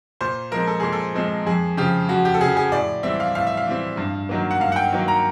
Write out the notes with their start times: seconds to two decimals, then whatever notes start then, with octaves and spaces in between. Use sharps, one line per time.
0.21 A#2 C5
0.51 F3 G#3 C4 A#4
0.67 A4
0.80 A#2 G#4
0.92 A4
1.15 F3 G#3 C4
1.46 F2 G#4
1.77 C#3 F3 G4
2.09 F2 F#4
2.25 G4
2.34 A4
2.41 C#3 F3 G#4
2.57 G#4
2.72 A2 D5
3.03 E3 G3 C4 E5
3.20 F5
3.35 A2 F5
3.47 E5
3.57 F5
3.66 E3 G3 C4
3.97 G2
4.29 D#3 F#3 A#3
4.51 F#5
4.60 G2 F5
4.72 F#5
4.76 G5
4.92 D#3 F#3 A#3
5.08 A#5